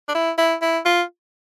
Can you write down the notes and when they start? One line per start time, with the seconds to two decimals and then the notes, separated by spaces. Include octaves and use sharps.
0.08 D4
0.15 E4
0.38 E4
0.62 E4
0.85 F4